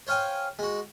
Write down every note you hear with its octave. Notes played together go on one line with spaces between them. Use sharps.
C5 C#5 F5 G5 G#5
G#3 F#4